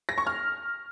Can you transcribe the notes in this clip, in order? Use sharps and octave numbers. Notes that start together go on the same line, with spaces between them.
A#6
C#6
F6